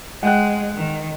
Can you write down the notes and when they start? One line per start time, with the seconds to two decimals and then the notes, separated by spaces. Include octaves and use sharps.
0.23 G#3 F#5 G5 F#6
0.75 D#3